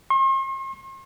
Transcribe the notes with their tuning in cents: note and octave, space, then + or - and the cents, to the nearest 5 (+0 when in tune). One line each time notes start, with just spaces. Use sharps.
C6 +45